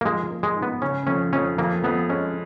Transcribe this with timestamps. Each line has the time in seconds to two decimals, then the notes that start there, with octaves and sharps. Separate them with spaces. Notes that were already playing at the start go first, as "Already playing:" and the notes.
0.01 A#3
0.05 F3 G#3
0.31 A#3
0.43 G#3
0.56 G#2
0.63 B3
0.82 C#3 C#4
1.07 F2 C#4
1.33 F2 C#4
1.58 F2 A#3
1.84 F2 B3
2.09 G#3 C#4